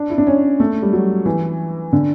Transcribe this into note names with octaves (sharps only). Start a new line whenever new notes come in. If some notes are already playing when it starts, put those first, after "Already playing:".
Already playing: D4
E4
D4
C#4
A3
G3
F#3
E3
D3